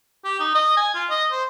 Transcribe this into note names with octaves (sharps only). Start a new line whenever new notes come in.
G4
D#4
D#5
G#5
F4
D#5
C5